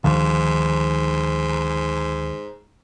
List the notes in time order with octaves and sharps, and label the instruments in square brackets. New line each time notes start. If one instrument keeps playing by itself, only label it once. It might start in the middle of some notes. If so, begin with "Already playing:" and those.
[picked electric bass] D2 D#3 F3 [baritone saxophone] G#2